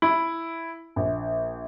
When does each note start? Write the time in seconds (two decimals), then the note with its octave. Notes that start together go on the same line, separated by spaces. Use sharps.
0.02 E4
0.96 A#1